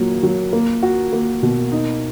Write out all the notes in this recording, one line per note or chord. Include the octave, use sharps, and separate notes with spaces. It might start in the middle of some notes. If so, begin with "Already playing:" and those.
Already playing: A#2 F#3 A#3
F#3
A#3
F#4
A#3
B2
D#4